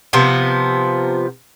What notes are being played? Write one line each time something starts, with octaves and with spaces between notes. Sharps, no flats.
C3 F3 B3